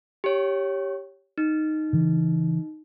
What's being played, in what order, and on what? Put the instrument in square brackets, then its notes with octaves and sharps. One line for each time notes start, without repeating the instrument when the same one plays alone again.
[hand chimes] G4 C#5
D#4
[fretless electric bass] C#3 E3